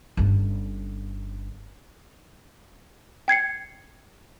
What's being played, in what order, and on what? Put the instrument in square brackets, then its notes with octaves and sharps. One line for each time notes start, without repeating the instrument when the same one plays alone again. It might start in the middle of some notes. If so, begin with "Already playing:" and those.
[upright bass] G1 C#4
[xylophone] G5 G#6 C7 C#7